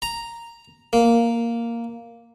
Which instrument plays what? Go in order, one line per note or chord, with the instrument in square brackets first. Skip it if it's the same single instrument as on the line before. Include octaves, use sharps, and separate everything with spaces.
[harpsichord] A#5
A#3